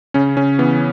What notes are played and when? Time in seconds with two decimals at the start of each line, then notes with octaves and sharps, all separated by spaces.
0.14 C#3 C#4
0.37 C#3 C#4
0.59 E3 B3